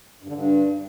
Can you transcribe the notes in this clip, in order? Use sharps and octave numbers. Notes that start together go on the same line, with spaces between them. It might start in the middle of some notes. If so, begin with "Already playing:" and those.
G2
D3
G2